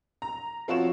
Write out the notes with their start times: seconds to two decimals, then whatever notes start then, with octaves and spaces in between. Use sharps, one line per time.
0.22 A#5
0.68 F3 C4 F4 F#4 C#5 E7